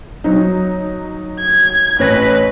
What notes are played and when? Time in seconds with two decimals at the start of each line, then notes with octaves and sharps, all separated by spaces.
0.24 F#3 D#4
1.40 G#6
1.99 A1 B4 C#5 A#6